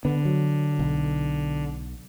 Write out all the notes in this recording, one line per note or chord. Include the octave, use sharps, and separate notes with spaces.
D3 B3
F#3
B1